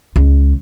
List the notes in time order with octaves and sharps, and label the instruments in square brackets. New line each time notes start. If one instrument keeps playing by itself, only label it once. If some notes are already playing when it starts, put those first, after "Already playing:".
[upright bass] C#2